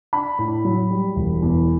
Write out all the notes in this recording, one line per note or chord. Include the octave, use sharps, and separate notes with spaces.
D4 B5
A2
F#3
G3
E1
E2